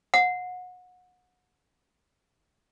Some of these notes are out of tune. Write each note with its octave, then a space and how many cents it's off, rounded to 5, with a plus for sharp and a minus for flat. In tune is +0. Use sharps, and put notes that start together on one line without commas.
F#5 -30